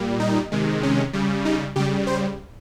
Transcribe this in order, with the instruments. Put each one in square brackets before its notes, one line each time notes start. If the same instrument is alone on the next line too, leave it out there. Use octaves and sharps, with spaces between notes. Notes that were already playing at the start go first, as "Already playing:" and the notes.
Already playing: [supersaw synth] A#2 G3
D#4
C3 D#3 G#3
C#4
C#3 G3
D#4
C#3 G3 G4
C5